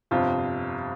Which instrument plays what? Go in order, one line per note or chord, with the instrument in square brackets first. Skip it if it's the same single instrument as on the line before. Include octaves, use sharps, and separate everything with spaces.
[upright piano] G1 F2 C3 F4